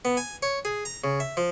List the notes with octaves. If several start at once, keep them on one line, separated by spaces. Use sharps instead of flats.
B3
G#5
C#5
G#4
A#5
C#3
E5
F3